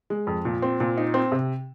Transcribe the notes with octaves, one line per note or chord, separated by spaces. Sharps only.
G#3
F2
A#2
C4
A#2
D#4
C4
C3